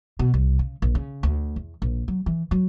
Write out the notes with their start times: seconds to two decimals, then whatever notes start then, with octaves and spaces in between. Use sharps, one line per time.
0.19 B2
0.34 C2
0.59 C#3
0.82 A#1
0.95 C#3
1.23 D2
1.56 E2
1.82 A#1
2.08 F#3
2.26 E3
2.51 F#3